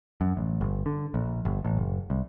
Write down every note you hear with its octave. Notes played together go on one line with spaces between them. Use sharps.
F#2
A1
G1
D3
A#1
G1
A1
F#1
C2